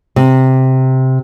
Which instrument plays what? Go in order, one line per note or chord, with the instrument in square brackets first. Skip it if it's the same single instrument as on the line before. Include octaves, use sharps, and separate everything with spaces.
[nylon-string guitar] C3